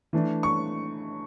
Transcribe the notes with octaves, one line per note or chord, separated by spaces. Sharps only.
E3 A3 D4
C#6